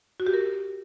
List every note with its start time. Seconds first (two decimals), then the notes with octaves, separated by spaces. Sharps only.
0.20 F#4
0.27 G4
0.33 A#4